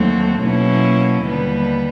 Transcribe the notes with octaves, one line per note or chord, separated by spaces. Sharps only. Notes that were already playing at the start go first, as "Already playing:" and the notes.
Already playing: D#2 D3 F#3 A3 C4
B2 F#3 A#3 C#4 E4
D#2 D3 G3 B3